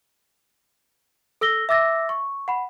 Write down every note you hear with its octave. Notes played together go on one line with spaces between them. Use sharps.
A4 E6 A#6 G7
E5 D6 E6 A6 A#6
C#6
F#5 B5